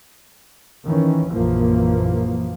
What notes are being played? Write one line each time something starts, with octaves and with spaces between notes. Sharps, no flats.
D#3 E3 C#4
A#1 F#2 E3 F3 A#3